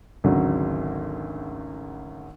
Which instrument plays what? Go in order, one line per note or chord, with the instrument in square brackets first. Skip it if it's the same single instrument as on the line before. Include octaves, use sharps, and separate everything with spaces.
[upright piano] G#1 D2 C#3 F#3